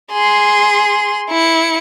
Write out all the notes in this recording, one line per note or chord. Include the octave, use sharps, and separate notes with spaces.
G#4 C6
E4 C#7